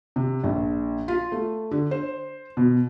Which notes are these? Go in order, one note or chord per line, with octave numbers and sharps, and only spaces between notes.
C3
A#1
F4
A3
D3
C5
B2